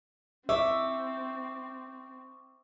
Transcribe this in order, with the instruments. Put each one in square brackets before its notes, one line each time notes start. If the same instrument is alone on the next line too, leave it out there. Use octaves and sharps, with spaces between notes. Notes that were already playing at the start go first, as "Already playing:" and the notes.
[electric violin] C4 [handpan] E5 [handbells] C#6 D6 E6